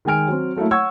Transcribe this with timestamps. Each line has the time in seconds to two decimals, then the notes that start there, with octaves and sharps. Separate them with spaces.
0.05 D#3 G#3 G5 G#5 F6 D7
0.28 F#3 C4
0.56 F#3 A3 A#3 E4
0.71 C#5 F#5 C#6 E6 G#6